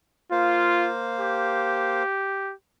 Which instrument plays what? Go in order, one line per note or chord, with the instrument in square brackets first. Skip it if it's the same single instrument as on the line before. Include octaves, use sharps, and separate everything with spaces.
[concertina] A#3 C5 F5 [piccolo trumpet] F4
[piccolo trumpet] G4